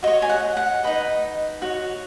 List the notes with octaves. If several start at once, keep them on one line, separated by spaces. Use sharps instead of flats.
F#4 C#5 D#5
G#5
F#5
F#5
D#4 B4 D#5
F#4 C#5